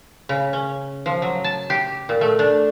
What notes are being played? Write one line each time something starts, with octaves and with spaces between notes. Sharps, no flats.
C#3
C#4
F3
F#3
A5
G4
A#2
A3
D4